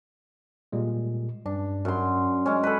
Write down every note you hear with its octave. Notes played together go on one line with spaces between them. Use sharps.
A#2 G3 G#3
G2 D4
F#2 C6
G#3 C#4
A4 B4